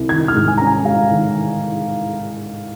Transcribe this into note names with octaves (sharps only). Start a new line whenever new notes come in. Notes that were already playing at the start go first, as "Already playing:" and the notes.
Already playing: C2
D#3 G#6
F6
G#2
G#5
C#4 A#5
G#5
G#3 F5
D#3